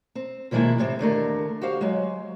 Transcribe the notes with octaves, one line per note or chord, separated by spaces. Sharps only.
C4
B2 D#3 F3 G#3 A#3 E4
A2 C3 C4
D#2 D3 A3 A#4
F#4 G4 C5 F5
F#3 G#3